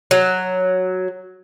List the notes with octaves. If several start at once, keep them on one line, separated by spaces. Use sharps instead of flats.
F#3